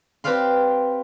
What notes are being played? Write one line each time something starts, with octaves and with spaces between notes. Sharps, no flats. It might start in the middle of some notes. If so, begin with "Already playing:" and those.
C4 G4 B4 D5 F5 C6